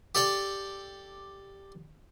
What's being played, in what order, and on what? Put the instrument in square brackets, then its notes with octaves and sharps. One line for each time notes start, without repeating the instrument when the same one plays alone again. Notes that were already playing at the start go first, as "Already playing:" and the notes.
[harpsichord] G4 A4 D5 G5